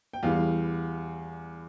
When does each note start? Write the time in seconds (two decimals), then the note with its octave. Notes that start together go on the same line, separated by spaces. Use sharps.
0.13 G5
0.23 E2 E3 G3 F5